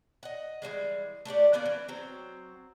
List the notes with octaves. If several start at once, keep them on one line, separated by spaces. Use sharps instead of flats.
D#5 F#5
E3 F3 G3 G#3
A3 D4 G4 D5
A#3 B3 C#4 D5
E3
F#3 C4